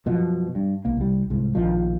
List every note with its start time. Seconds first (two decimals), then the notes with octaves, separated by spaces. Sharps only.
0.06 F#2 B2 F3
0.55 G2
0.85 B1 A#3
0.97 C2 G3
1.30 C2 G#2
1.55 A#1 B2 D#3 F3